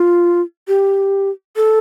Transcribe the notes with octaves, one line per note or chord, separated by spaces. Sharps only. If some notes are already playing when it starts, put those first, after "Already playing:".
Already playing: F4
G4
A4